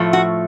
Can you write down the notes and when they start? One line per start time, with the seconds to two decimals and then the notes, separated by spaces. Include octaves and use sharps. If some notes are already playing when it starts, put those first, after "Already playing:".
Already playing: A2 F3 A3
0.13 F#4